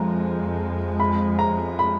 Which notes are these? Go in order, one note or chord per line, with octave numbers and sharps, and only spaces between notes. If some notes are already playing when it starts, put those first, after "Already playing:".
Already playing: F2 F3 G#3 A#5
B5
A#5
B5